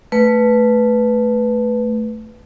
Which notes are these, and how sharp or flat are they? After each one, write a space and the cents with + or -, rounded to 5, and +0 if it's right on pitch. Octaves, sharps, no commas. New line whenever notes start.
A3 +0 B4 +0